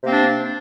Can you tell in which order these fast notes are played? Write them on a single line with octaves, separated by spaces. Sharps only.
C3 A#3 C4 D4